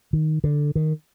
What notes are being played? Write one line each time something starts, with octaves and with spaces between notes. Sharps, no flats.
D#3
D3
D#3